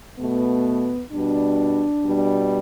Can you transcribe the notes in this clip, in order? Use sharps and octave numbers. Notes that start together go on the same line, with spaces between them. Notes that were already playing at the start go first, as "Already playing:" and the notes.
B2 A3 B3
B2 G3 D4
B2 G3